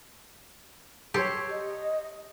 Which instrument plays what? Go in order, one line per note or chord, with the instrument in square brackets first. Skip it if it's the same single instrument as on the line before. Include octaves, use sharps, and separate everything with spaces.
[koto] G4 [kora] A4 C5 C#5
[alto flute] D#5